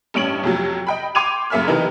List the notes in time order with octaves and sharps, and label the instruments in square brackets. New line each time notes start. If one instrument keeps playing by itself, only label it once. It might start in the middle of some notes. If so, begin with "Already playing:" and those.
[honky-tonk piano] A1 G2 C#4 D7 F#7
F2 C3 F#3
D#5 G5 B5
G5 C6 D6 G#6 D#7 F7
F#2 C#3 A#3 E5 G#5 F6
C3 E3 B3 D#4 A#4